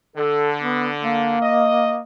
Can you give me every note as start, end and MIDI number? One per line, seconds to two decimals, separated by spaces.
0.16 1.36 50
0.16 0.50 69
0.62 0.88 59
1.03 2.01 58
1.42 1.99 75